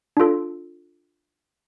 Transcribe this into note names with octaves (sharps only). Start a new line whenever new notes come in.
D4 F4 A4